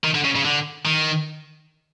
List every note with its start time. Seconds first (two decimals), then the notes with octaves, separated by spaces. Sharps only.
0.04 D#3
0.15 D3
0.25 C#3
0.36 C#3
0.45 D3
0.86 D#3